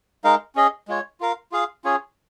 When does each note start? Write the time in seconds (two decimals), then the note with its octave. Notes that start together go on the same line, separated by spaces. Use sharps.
0.24 G#3 D#4 A#4 F5
0.55 C#4 G#4 D#5
0.88 G#3 F4 C#5
1.20 F4 A#4 F5
1.52 F4 G#4 F5
1.84 C#4 F4 G#4 C#5